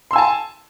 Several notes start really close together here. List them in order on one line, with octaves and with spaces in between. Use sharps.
C6 E6 G#5 A5